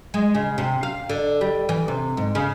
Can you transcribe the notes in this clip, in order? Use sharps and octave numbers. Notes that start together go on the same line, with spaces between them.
G#3
C#3
C3
F5
D3
G3
E3
C3
G#2
C#3